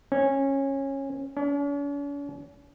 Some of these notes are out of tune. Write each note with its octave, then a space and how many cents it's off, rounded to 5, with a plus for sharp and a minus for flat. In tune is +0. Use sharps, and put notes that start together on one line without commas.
C#4 -20
C#4 +45